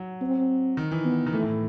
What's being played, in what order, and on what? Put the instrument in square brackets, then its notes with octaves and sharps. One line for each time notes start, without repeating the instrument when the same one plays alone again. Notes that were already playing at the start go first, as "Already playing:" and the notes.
Already playing: [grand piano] F#3
[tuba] C4
[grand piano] D#3
E3
[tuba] B3
[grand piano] D#3
[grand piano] E3 [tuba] A3
[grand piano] A2